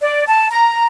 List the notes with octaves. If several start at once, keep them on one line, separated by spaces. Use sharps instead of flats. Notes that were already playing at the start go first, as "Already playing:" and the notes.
D5
A5
A#5